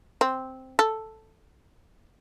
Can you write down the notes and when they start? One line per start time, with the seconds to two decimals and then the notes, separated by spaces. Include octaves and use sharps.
0.21 C4
0.79 A4